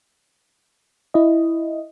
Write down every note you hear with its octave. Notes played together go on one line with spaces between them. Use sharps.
E4 D#5